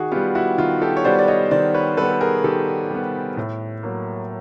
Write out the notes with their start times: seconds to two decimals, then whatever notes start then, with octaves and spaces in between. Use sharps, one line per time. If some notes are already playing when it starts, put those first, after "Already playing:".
Already playing: D#3 F#4 G#4
0.12 B3 F4 G4
0.16 G3
0.35 E4 F#4
0.58 D#3 F4
0.82 G4 A4
0.97 C#5
1.05 G3 B3 C5 D5
1.19 D5
1.28 C#5 D#5
1.51 D#3 C5 D5
1.74 B4 C#5
1.97 G3 B3 A4 B4
2.10 A4
2.21 G#4 A#4
2.44 D#3 G4 A4
2.91 G3 B3
3.37 A2
3.83 F#3 A#3